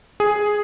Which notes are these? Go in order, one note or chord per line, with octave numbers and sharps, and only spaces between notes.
G#4